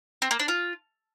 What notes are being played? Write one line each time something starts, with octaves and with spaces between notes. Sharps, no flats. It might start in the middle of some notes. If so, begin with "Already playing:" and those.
C4
A#3
D4
F4